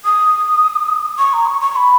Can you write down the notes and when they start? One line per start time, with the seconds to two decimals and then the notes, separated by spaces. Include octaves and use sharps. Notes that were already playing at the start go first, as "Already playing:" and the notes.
0.05 D#6
1.18 C#6
1.33 A#5
1.47 C#6
1.61 C#6
1.76 B5